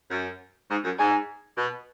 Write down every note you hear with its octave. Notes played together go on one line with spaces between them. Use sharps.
F#2
G#2
F#2
G#2 G#5
B2